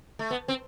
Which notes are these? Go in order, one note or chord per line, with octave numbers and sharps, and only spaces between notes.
A3
B3
C4